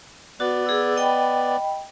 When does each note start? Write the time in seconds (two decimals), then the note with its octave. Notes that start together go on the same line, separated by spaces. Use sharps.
0.40 B3 F#4 D5
0.66 G#4 E6
0.97 D#5 G5 B5